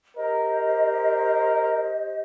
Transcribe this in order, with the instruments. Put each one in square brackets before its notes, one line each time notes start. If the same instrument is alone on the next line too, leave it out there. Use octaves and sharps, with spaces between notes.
[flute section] G4 C5 D#5 [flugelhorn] A#4